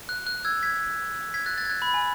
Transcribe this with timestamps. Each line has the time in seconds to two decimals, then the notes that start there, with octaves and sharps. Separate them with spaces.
0.09 F#6
0.27 F#6
0.45 E6 G#6
0.63 G#6 B6
1.34 G#6 B6
1.46 F#6 A6
1.58 F#6 A6
1.65 G#6
1.70 F#6
1.82 B5
1.94 G#5